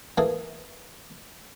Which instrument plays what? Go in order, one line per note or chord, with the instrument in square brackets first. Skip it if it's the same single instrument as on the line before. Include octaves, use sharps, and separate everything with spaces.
[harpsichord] E3 A#3 G#4 A4